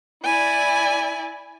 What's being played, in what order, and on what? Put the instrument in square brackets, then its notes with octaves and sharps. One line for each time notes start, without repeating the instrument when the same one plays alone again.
[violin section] E4 D5 [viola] G#5